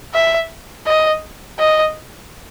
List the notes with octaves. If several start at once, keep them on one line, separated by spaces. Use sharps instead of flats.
E5
D#5
D#5